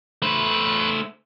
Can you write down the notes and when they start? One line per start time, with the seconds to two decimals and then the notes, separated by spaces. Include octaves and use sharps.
0.22 A3 B4 C5